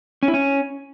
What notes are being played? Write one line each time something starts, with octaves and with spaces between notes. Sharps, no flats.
C#4
E4
C#4